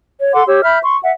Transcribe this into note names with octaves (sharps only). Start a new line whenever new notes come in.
C#5
A4 F#5 C6 D6
G4 C#5 E6
E5 B5 F6 G6
C6 C#6
E5 F#5